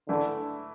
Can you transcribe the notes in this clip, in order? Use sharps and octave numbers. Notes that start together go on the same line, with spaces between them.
D3 E3 A3 E4